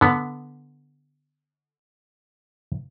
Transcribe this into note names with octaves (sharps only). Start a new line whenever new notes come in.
D3 B3